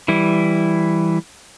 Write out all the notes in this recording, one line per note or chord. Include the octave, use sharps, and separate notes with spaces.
E3 G3 E4